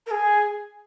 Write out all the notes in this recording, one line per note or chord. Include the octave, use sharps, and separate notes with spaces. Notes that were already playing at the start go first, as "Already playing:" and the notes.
A#4
G#4